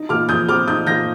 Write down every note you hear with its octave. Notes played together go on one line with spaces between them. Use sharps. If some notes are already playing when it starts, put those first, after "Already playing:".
Already playing: D#4
A#2 D6 F6
F3 D#6 G6
C4 D6 F6
D#4 D#6 G6
A#2 G6 A#6